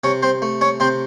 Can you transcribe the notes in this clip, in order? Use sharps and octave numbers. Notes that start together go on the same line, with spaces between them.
C3 C#4 C#5
C4 C5
A3
C#4 C#5
C3 C4 C5